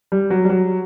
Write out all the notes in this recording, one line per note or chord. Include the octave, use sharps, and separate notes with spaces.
G3
F#3
G3
F#3